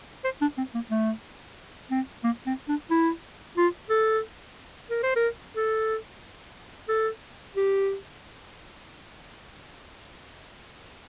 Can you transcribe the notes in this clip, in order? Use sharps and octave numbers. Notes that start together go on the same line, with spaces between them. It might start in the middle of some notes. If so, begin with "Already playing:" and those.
C5
D4
C4
A#3
A3
C4
A#3
C4
D4
E4
F4
A4
A#4
C5
A#4
A4
A4
G4